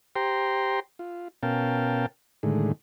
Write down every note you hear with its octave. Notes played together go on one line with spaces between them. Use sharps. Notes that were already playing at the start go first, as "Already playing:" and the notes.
G4 C5 G5 A#5 C6
F4
B2 C#4 A#4 F5 G5 A5
A2 D3 D#3 G#3